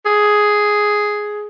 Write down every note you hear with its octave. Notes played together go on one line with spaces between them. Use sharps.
G#4